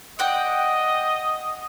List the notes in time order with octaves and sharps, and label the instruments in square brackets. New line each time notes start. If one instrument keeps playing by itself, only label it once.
[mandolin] D5 F#5 G5 [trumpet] D#5